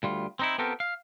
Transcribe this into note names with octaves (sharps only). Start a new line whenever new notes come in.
D2 G3 F4
C4 D#4 E4
B3 C4 F4 G4 A4 A#4
F5